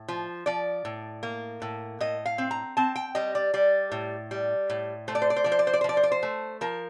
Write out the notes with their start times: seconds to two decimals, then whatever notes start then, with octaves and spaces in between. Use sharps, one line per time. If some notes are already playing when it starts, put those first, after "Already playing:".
Already playing: A2
0.08 F3
0.46 F3 D5
0.85 A2
1.23 A#3
1.62 A2
2.00 A2 D#5
2.26 F5
2.38 C4
2.51 A#5
2.77 C4 A5
2.96 G5
3.15 G3 D#5
3.35 D5
3.54 G3 D5
3.92 A2
4.31 G3
4.70 A2
5.08 A3 C5
5.15 D5
5.22 C5
5.30 D5
5.36 C5
5.44 F3 D5
5.52 C5
5.59 D5
5.67 C5
5.73 D5
5.81 C5
5.84 F3 D5
5.97 C5
6.03 D5
6.12 C5
6.23 A3
6.61 F3 A#4